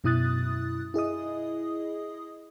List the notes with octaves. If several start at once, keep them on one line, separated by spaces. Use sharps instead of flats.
F#2 B2 E4 D#6 F#6 A6
E4 G#4 D#5 D#6